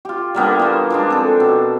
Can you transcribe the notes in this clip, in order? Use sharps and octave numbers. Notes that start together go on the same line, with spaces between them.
F4 G4
G3 A#3 B3 D4
E3 C5
F3 G#3 D4
C4 A4
B2